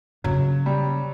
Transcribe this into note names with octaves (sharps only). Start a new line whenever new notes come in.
C#3 F#3
G3